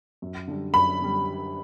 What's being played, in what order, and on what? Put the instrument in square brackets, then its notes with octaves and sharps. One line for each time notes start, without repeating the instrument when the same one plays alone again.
[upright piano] F#2
D3 G3
[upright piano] F#2 [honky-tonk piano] B5
[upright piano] D3 G3